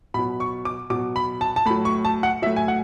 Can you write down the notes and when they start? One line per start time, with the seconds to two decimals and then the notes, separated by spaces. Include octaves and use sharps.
0.14 B2 B5
0.19 F#3
0.40 C#6
0.65 D6
0.90 B2 F#3 D6
1.16 B5
1.41 A5
1.56 A5
1.66 A2 B5
1.70 F#3
1.85 C#6
2.05 A5
2.23 F#5
2.42 F#3 E5
2.46 A2
2.56 G#5
2.68 F#5